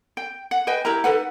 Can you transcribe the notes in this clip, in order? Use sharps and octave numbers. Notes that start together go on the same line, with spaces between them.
G5
F#5
B4 D#5 G5 G#5
E4 G4 A#4 A#5
D#4 A4 B4 F#5